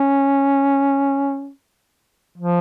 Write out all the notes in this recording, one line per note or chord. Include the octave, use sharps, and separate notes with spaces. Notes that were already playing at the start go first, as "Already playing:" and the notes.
Already playing: C#4
F3